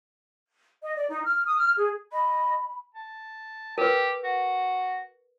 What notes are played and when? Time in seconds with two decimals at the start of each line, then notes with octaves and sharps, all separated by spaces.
0.83 D#5
0.96 D5
1.09 D#4
1.24 F6
1.46 D#6
1.58 F6
1.77 G#4
2.12 D#5 B5
2.94 A5
3.78 G4 A#4 B4
4.24 F#4